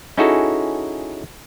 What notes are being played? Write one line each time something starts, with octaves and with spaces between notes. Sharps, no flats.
C#4 D#4 E4 F#4 G#4 A4